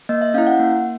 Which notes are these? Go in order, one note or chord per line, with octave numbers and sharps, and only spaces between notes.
A#3 D#5
E5
C#4 E4 F5
F#5
A#3